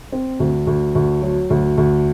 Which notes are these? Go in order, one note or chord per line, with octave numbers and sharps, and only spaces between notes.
C4
D2
D2
D2
F#3
D2
D2